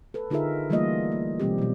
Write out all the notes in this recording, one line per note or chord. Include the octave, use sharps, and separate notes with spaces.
A4 B4
D3 D#4 F4 G#4 A#4 E5
E3 G3 A3 A#3 F4 D#5
A#3
B2 E3 G3 C4 G4
B2 F#3